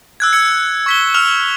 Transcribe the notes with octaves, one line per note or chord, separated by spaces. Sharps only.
E6 F#6 G#6
E6 G#6 C#7
C#6 B6 G7
E6 F6 F7